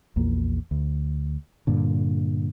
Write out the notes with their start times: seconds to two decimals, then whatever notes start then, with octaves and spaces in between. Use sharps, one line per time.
0.16 A#1 E2 A#3
0.71 D2
1.67 G2 A#2 D3